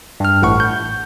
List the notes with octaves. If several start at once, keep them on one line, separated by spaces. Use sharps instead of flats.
G2 F6
A1 A2 F#5 C#6
G6